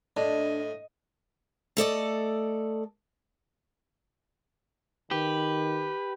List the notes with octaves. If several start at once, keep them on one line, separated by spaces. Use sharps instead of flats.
A2 D4 D#5
A3 A4 D5 D#5
D#3 G4 B4